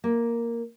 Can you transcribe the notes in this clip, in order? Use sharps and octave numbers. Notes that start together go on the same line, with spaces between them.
A#3